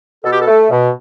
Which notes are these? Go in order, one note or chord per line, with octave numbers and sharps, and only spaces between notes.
B2 A4
G4
A4
A3
B2